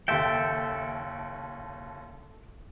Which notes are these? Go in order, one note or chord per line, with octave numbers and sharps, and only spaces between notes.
F#1 D#2 A4 E5 G5 A6